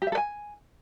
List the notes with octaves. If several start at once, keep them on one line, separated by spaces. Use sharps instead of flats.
G4
E5
A4
G#5